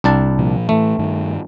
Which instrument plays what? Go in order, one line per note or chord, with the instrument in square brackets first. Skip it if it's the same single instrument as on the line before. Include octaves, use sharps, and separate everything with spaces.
[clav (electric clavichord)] C2 D4 A5
[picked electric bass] A#2 F3
[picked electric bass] A2 E3 [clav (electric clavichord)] A3
[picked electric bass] G2 D#3